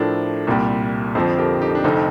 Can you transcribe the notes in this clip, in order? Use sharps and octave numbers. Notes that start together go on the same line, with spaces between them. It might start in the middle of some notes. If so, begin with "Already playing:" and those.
Already playing: A2 F3 A3 D4 A4 A#4 C5
C2 A#2 G3
F2 D3 F3 A4 C5
G4 A#4
D#4 G4
D4
F1 F2 D3 C4 D#4